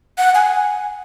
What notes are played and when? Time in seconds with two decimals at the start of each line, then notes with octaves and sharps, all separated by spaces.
0.18 F#5
0.35 G#5